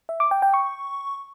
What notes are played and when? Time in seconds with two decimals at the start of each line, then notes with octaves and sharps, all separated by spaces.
0.09 E5
0.20 D6
0.31 G5
0.42 G5
0.54 C#6